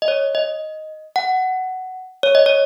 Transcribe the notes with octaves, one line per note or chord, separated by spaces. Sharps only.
D#5
C#5
D#5
F#5
C#5
D#5
C#5